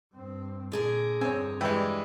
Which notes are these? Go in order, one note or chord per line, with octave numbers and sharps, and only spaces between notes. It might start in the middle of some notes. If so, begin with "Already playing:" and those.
G2 C4
A#2 D3 G#4 A#4
E2 G2 C4 C#5 G#5
E3 G3 G#3 G5